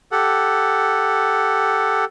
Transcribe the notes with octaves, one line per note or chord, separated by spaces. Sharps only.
G4 A4 F#5